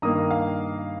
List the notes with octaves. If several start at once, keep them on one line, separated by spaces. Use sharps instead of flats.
G2 D#3 A#3 A#5 D#6
F5